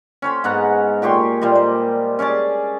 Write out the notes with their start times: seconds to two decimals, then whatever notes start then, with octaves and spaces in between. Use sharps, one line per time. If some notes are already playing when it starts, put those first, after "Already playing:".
0.22 C#4 C5 B5
0.44 G#2 B3 F#5 A#5
1.02 A#2 G4 C#5 C6
1.41 A#2 G3 C5 D#5
1.55 C5
2.19 C#4 G#4 D5 A5